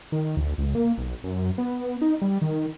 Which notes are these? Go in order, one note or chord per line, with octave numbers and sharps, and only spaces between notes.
D#3
D2
C#2
A#3
B1
F#2
B3
D#4
G3
D#3